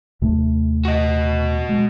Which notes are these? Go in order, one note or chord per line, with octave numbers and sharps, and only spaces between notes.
D#2 C3 A3
F#4 D#5
G#3